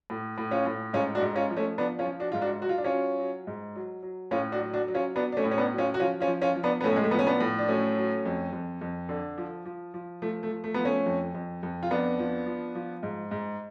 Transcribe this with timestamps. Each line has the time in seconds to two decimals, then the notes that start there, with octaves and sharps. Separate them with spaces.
0.10 A2
0.38 A2
0.51 C#4 F4
0.66 A2
0.93 G#2 C#4 F4
1.15 D4 F#4
1.22 G#2
1.36 C#4 F4
1.50 F3
1.56 A3 C#4
1.78 F3 B3 D4
1.99 C#4 F4
2.06 F3
2.20 D4 F#4
2.32 G#2 F4
2.41 D4 F#4
2.62 F#3 F#4
2.69 F4
2.78 D4
2.84 C#4 F4
2.91 F#3
3.19 F#3
3.47 G#2
3.76 F#3
4.03 F#3
4.31 A2 C#4 F4
4.52 D4 F#4
4.59 F#3
4.74 D4 F#4
4.88 F#3
4.94 C#4 F4
5.15 F#3 B3 D4
5.32 D4
5.37 A3 C#4
5.44 A2
5.51 C#4
5.58 B3 D4
5.72 F#3
5.78 C#4 F4
5.94 F#4
6.00 F3 C#4 F4
6.20 C#4 F4
6.27 F3
6.42 C#4 F4
6.56 F3
6.63 B3 D4
6.81 B3
6.84 A2 A3 C#4
6.96 G#3
7.04 A3
7.11 F3 B3
7.19 C#4
7.27 B3 D4
7.40 A2
7.59 D4
7.68 F#3 A3 C#4
7.97 F#3
8.25 F2
8.52 F2
8.81 F2
9.09 D3
9.38 F3
9.65 F3
9.94 F3
10.22 F3 A3
10.43 A3
10.50 F3
10.64 A3
10.74 F3 B3
10.85 A3 C#4
11.06 F2
11.34 F2
11.63 F2
11.83 F4
11.91 F2 B3 D4
12.19 F3
12.46 F3
12.75 F3
13.03 G#2
13.31 G#2